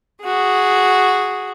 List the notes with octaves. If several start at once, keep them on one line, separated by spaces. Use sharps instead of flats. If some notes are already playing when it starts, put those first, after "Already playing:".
F#4 G#4